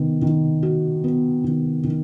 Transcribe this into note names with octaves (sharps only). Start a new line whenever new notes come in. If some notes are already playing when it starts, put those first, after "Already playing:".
Already playing: D#3 B3
D#3
F#4
B3
D#3
D#3